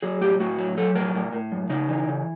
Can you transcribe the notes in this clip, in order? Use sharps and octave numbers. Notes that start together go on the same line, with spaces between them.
F#3 G#4
A2 G4
A2 F#4
F#3
F#3 A4
A2 A#4
A2
A2
F#2
C#3 D#4
E3
C#3